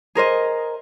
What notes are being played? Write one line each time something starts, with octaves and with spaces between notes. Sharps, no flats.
G#4 A#4 C5 D#5